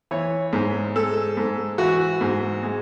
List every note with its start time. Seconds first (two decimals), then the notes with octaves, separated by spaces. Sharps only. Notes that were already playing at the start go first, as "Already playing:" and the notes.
0.11 E3 C#5
0.53 G#2
0.95 G#3 A4
1.37 G#2
1.78 E3 F#4
2.21 G#2
2.63 G#3